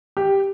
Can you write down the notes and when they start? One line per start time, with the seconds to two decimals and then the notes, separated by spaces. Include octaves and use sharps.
0.17 G4